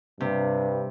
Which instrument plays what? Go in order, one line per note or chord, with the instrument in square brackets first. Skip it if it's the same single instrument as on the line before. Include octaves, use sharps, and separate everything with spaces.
[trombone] G2 [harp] C3